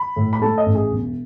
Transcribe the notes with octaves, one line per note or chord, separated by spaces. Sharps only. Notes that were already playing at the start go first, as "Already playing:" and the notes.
Already playing: B5
A2
B5
A3 A5
D#5
A1
G#4
E1